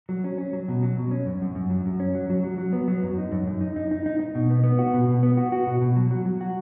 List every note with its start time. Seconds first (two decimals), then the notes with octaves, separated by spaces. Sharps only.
0.09 F#3
0.24 C#4
0.38 C#4
0.53 F#3
0.68 B2
0.83 F#3
0.98 B2
1.11 C#4
1.26 F#2
1.42 F#2
1.55 F#2
1.70 F#3
1.86 F#2
2.00 C#4
2.15 F#3
2.30 F#3
2.44 F#3
2.58 F#3
2.73 B3
2.88 F#3
3.03 F#2
3.18 D#4
3.32 F#2
3.47 F#2
3.61 D#4
3.76 D#4
3.91 D#4
4.06 D#4
4.20 D#4
4.35 B2
4.50 B3
4.64 B3
4.79 F#4
4.94 B2
5.08 B2
5.23 B3
5.37 F#4
5.52 F#4
5.67 B2
5.82 B2
5.96 F#3
6.11 F#3
6.26 F#3
6.41 F#4